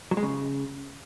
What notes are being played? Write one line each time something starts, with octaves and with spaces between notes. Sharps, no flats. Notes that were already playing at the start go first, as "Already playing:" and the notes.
F#3
G#3
C#3